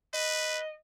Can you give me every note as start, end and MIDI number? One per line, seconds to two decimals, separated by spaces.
0.14 0.60 71
0.14 0.74 75